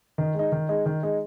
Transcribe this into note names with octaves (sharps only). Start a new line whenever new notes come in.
D#3
G#3 D#4
D#3
G#3 D#4
D#3
G#3 D#4